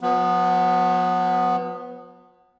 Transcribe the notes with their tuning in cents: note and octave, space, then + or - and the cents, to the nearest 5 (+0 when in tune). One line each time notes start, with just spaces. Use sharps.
F3 +45 B3 +0